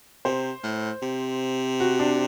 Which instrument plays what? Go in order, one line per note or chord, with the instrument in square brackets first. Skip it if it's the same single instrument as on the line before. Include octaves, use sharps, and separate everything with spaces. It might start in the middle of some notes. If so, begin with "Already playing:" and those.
[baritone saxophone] C3 [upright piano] C5
[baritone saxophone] A2
C3
[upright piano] F#4
D4